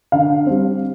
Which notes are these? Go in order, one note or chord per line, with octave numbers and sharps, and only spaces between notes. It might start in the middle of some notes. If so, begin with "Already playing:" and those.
D3 F5
G3 C4